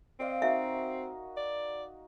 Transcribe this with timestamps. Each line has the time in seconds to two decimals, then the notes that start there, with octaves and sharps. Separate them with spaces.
0.20 C4 D5 D#5 F5
0.42 D#4 F#4 A#4 E5
1.37 D5